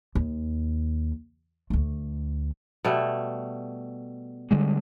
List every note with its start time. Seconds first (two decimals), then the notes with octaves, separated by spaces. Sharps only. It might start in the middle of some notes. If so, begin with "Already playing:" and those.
0.15 D#2
1.70 D2 A3
2.84 B2 G3 A3
4.51 D3 G3 G#3